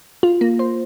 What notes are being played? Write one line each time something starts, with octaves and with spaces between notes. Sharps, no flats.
F4
A#3
C5